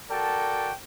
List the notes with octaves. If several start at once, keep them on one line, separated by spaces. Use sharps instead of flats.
F#4 A4 A#4 D5 G5 A5